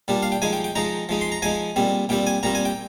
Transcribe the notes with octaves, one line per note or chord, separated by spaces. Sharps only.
A#2 G3 D4
F5
G5
F3 G#3 D#4 G#5
G5
G5
F3 G#3 D#4 A#5
F3 G#3 D#4
C6
A#5
F3 G#3 D#4 G#5
A#2 G3 C4
A#2 G3 C4 G5
G#5
A#2 G3 C4 A#5
G#5
G5